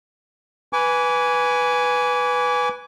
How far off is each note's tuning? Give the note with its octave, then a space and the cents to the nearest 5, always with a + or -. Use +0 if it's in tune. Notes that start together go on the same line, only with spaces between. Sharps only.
B4 -5 G#5 +0 D6 -35